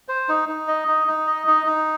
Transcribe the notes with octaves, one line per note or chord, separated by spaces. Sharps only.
C5
D#4
D#4
D#5
D#4
D#4
D#5
D#4
D#4